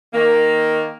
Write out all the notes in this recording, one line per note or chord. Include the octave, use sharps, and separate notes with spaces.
D#3 A#3